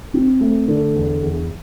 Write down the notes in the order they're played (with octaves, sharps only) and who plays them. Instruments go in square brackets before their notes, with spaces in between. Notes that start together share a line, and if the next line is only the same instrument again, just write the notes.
[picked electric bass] C4
A3
D3
E2
E2